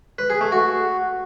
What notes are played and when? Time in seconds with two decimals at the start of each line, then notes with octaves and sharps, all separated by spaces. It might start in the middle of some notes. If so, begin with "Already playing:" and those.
0.18 B4
0.30 G#4
0.41 A3
0.52 F#4